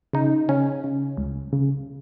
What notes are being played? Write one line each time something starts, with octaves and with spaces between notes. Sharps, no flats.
C#3 D#4
C#3 C#4
C#3
C#2
C#3